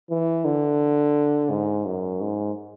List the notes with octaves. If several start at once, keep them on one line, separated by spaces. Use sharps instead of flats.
E3
D3
G#2
F#2
G#2